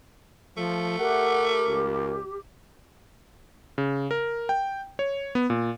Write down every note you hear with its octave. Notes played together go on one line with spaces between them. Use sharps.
F3 A3
G4 A#4 E5 F#5
C#2
C#3
A#4
G5
C#5
B3
A#2